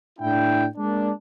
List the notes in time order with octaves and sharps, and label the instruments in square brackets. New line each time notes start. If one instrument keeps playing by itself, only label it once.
[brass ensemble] A2 D4 E4 G5
G#3 A#3 D4